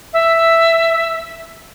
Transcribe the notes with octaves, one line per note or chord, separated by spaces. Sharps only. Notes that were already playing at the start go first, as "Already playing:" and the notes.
E5